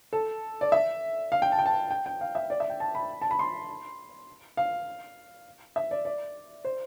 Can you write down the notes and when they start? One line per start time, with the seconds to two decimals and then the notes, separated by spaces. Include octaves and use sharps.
0.13 A4
0.61 D5
0.72 E5
1.32 F5
1.42 G5
1.52 A5
1.59 G5
1.66 A5
1.91 G5
2.06 G5
2.21 F5
2.35 E5
2.50 D5
2.60 E5
2.70 G5
2.80 A5
2.95 B5
3.22 A5
3.31 B5
3.39 C6
4.57 F5
5.76 E5
5.91 D5
6.05 D5
6.65 C5